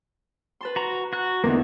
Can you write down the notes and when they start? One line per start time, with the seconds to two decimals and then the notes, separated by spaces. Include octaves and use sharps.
0.61 B4 A5 C6
0.76 F#4 A#5
1.13 F#4 F#6
1.44 E2 D3 A#3 D#4